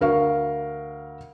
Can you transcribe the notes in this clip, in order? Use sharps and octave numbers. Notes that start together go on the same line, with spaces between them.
D2 A#4 F5 C#6